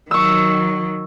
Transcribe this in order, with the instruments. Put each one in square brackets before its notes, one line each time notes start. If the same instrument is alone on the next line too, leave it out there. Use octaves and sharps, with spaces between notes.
[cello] D#3 F#3 [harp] C#6 E6